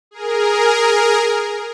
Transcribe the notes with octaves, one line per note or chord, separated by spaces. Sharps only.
G#4 A#4